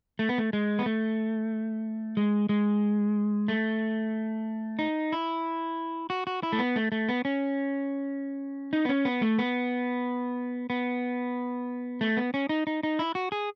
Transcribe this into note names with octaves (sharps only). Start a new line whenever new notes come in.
A3
B3
A3
G#3
B3
A3
G#3
G#3
A3
D#4
E4
F#4
F#4
E4
A3
B3
A3
A3
B3
C#4
D#4
B3
C#4
B3
A3
B3
B3
A3
B3
C#4
D#4
D#4
D#4
E4
F#4
G#4